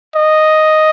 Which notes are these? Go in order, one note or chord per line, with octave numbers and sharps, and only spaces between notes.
D#5